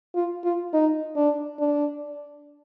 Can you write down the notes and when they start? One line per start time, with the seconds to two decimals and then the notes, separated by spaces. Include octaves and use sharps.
0.15 F4
0.44 F4
0.74 D#4
1.16 D4
1.59 D4